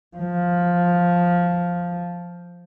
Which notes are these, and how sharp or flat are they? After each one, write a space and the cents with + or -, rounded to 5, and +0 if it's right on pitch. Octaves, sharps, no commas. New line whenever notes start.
F3 +5